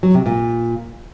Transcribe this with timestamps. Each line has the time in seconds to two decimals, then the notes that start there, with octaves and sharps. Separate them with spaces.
0.03 F#3
0.14 C3
0.26 A#2